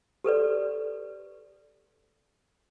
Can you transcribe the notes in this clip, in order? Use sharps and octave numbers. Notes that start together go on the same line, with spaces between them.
G4 A4 B4 D5